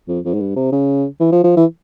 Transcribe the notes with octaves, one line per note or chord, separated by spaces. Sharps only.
F2
F2
G#2
G2
C3
C#3
E3
F3
F3
E3